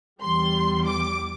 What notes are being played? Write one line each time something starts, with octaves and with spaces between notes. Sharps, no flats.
E2 E3 G3 C6
D6